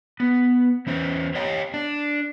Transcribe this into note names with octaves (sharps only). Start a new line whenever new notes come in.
B3
E3 C#4 C5
G4 C#5 D#5 F5 G5
D4